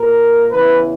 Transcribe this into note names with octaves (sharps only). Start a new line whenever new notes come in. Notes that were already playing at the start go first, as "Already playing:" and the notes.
Already playing: A#2 A#4
E2 C#3 E3 B4